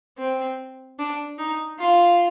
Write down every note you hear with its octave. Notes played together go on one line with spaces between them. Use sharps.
C4
D4
D#4
F4